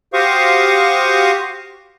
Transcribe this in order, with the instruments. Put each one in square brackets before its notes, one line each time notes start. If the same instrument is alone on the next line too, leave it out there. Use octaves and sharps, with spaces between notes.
[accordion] F#4 G4 C5 F5 C#6 D#6